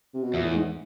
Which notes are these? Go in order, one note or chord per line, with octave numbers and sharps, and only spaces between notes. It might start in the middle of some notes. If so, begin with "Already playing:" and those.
C3
B2
E2 A#2
A2
G#2